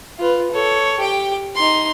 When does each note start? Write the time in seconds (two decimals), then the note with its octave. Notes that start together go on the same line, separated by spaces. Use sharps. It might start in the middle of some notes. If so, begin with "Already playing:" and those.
0.19 F4 B4
0.52 A4 C#5
0.99 G4 G5
1.56 D#4 C6